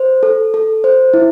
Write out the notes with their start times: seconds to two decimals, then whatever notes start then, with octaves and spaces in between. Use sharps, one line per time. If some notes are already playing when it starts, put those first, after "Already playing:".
Already playing: C5
0.23 A4
0.54 A4
0.84 C5
1.14 E4